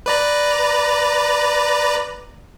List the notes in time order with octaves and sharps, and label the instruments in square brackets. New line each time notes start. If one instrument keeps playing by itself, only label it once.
[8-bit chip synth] B4 D5 A#5